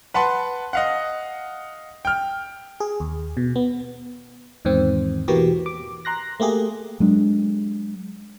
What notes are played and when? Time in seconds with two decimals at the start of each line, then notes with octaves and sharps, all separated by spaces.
0.14 B4 F#5 A5 C6
0.73 D#5 F5 F#5
2.05 G5 F6
2.80 G#4
3.00 D#2
3.37 B2
3.56 B3
4.65 E2 G#2 D#3 C4
5.28 B2 E3 A#3 B3 F#4 G4
5.66 D6
6.05 A#5 C6 F#6 A#6
6.40 A3 A#3 G4 G#4
7.00 F#3 G#3 D4